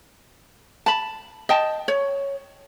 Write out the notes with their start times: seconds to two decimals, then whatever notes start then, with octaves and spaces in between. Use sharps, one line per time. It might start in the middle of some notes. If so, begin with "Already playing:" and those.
0.86 A5 B5
1.49 D#5 G5 A5
1.88 C#5